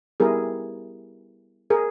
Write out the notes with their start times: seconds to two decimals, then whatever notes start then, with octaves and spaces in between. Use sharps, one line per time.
0.20 G3 B3 E4 G4 G#4 A#4
1.70 G#4 A#4